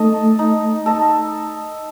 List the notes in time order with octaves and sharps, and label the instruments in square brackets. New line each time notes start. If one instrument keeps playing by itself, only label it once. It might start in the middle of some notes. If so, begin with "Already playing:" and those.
Already playing: [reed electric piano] A3 [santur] D#4 A4 D#5
[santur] D#4
A4 D#5